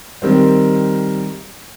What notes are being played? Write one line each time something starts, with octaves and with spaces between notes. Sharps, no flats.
D#3 G3 C4